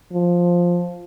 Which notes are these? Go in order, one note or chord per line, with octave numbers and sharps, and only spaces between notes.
F3